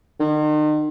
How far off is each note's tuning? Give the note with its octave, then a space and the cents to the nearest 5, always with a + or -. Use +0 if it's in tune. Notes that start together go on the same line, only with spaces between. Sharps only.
D#3 -40